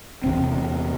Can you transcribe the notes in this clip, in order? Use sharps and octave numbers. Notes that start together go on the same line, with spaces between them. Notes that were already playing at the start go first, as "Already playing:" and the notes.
E2 C3 C4